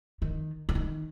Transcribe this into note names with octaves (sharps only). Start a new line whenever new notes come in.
D#3
D3
D#3